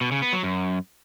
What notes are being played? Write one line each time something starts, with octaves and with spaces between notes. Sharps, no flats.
B2
C#3
B3
F#3
F#2